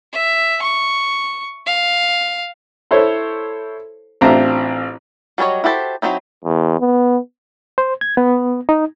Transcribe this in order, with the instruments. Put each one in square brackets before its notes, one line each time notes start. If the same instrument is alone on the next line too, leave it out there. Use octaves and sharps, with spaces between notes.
[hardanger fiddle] E5
C#6
F5
[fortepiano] E4 A4 C5 C#5
A1 C4 D4 F4 E5 A#5
[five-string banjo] F#3 G3 C#4 C#5 D#5
E4 F#4 G4 A4 C5
F#3 C4 D#4 E4
[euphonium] E2
B3
[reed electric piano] C5
G#6
B3
D#4